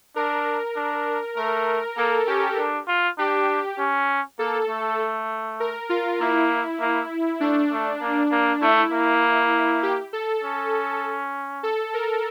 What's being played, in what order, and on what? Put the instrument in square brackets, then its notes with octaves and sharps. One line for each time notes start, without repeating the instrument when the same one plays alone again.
[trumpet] D4 [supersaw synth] A#4
[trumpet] D4
[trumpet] A3 [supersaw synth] A#4
[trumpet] A#3 [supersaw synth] A4
[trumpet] C#4 [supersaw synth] G4
[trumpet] D4
F4
[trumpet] D4 [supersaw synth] G4
[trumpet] C#4
[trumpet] A#3 [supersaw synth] A4
[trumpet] A3
[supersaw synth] A#4
F4
[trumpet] A#3 [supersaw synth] E4
[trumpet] A#3
[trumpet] A3 [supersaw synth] D4
[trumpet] A3
A#3
A#3
[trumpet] A3 [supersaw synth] E4
[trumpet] A#3
[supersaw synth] G4
A4
[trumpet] C#4
[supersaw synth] A4
A#4